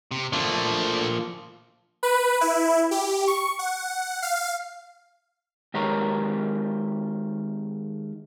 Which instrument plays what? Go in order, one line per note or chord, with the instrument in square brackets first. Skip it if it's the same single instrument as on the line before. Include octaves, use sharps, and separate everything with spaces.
[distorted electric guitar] C3
[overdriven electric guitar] F3 A#3 [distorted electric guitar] A3 D4
[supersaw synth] B4
E4
G4
C#6
F#5
F5
[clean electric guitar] D#3 G#3 G4 A#4 B4 C#5